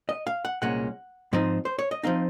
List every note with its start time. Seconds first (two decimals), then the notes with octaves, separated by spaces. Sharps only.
0.09 D#5
0.27 F5
0.45 F#5
0.62 C2 A#2 G#3 C#4 F#5
1.33 G#2 F3 C4 D#4
1.65 C5
1.79 C#5
1.91 D#5
2.03 F3 C4 D#4 F5